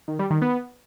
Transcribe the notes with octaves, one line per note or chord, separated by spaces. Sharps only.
D#3
G3
D#3
B3